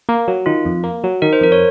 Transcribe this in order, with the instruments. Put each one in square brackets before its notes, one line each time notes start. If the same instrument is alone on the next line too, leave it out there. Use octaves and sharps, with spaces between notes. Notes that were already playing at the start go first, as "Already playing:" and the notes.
[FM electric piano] A#3
F#3
[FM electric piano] D#3 [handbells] F4
[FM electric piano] F2
A#3
F#3
[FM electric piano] D#3 [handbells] A#4
[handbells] C5
[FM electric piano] F2 [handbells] A#4
[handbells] C#5